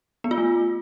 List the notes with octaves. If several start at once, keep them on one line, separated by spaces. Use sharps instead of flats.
B3
F4
A3